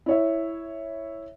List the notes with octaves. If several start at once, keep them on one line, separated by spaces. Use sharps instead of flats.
E4 C#5 E5